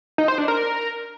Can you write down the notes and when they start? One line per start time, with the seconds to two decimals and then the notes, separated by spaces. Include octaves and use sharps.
0.18 D#4
0.28 C5
0.38 D4
0.48 A#4